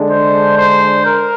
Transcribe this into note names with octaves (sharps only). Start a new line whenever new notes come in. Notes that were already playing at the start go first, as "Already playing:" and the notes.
Already playing: D3 G#3 D4
C5
C5
A#4